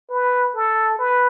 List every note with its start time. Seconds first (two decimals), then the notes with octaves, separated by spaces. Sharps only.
0.10 B4
0.55 A4
0.99 B4